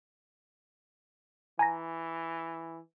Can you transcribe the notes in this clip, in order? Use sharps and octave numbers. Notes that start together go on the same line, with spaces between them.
E3 G#5 A#5 A#6